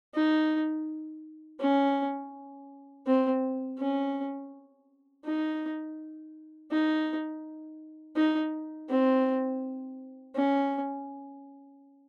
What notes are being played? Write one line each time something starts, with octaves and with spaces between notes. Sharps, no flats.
D#4
C#4
C4
C#4
D#4
D#4
D#4
C4
C#4